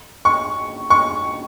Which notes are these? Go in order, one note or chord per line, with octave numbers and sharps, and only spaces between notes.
C#6
C#6